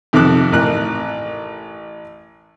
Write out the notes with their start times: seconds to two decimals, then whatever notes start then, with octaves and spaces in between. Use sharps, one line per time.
0.13 F2 C3 D#3 A4 D6 F#6
0.52 A1 A#4 F#6